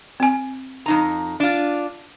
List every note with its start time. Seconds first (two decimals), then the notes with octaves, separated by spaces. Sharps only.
0.20 C4 G#5
0.86 F2 D#4 A#5
1.40 D4 F4